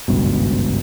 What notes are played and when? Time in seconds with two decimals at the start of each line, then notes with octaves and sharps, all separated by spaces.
0.08 G#1 C#2 G2 B2